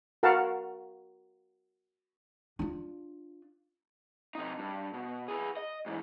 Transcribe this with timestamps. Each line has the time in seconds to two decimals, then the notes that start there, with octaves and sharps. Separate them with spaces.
0.23 F#4 A#4 F5 F#5 A5
2.59 D4 F4
4.35 C3 D#4
4.59 G2
4.94 B2
5.28 G#4 B4
5.57 D#5
5.86 G#2 E3